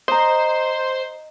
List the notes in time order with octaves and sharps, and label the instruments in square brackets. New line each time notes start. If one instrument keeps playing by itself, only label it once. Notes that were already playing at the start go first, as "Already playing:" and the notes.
[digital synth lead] C5 [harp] D#5 A#5